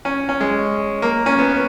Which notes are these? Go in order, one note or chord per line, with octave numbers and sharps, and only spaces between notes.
C#4
C#4
G#3
A#3
C#4
B3